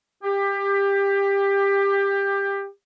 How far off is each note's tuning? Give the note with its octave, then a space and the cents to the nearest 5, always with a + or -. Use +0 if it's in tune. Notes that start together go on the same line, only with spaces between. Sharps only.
G4 +20